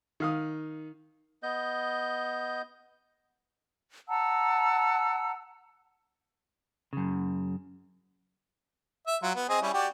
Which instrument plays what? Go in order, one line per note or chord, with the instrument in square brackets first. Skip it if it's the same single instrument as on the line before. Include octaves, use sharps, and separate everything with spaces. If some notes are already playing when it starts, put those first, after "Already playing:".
[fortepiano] D#3 F5 D#6
[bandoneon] B3 D#5 G6
[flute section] F#5 A5 A#5 E6
[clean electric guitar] F#2 C#3
[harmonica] E5
F#3 F4
B3
C4 G#4 D#5
G3 C#4 E4
F#4 G4 D5